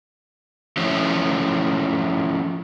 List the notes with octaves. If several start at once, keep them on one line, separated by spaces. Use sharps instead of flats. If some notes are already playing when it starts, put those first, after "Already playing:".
F3 A3 C#4 E4